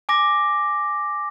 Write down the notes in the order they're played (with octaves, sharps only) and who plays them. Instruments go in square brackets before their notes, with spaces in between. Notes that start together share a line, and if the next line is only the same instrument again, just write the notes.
[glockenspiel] G#5 D6 A#6